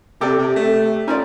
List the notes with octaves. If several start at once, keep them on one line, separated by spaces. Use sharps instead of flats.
C3 G4 A4 D5
C3
A3
C#4 D#4 F4 D5